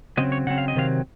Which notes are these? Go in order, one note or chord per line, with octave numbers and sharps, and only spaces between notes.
C#3 F#3 C4 D#5
C#5
C#3 F#3 C4 F#5
F5
D#5
C3 D#3 F#3 C4 F5